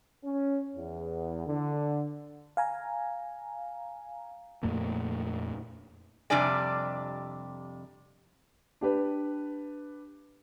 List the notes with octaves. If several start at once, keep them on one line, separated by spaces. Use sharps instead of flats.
C#4
E2
D3
F5 G#5 A#5
F2 A#2 A3 A#3
F2 C3 G3 D4 D5 G#5
D4 G4 B4